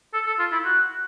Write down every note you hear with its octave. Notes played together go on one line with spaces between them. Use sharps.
A4
A4
F4
E4
F#4